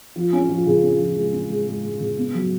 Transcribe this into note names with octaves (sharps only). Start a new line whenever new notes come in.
F3
C#4
F3
C#3
C#4
F3
G#3
C#4
G#3
G#3
G#3
C#3
B3
F#3